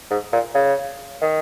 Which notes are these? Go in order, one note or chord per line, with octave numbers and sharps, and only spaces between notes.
G#2
A#2
C#3
D#3